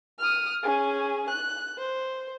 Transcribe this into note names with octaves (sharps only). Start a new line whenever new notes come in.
D#6 F6
C#4 G#4
F#6
C5